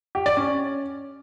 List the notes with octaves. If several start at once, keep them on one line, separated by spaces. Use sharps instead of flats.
G4
D5
C#4